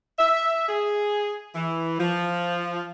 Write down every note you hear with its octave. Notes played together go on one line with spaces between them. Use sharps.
E5
G#4
E3
F3